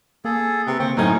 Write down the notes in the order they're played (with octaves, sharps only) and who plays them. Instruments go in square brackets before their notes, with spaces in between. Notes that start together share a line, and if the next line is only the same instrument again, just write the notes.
[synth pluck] A#3 [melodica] G#4 A4
[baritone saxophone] C3 [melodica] B4
[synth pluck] D3 A#3 [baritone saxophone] C4 [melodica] C#6
[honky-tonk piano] F#2 A2 G#6 [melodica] A3 C#4 F#4 [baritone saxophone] D#4